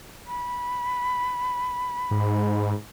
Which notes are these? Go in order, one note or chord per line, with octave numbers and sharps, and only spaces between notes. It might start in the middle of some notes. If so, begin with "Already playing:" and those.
B5
G#2